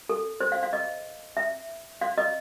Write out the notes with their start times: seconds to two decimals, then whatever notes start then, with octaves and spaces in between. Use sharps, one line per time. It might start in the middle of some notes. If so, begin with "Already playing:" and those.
0.09 A4
0.40 C5
0.52 F5
0.63 F5
0.73 D#5
1.37 E5
2.01 F5
2.18 D#5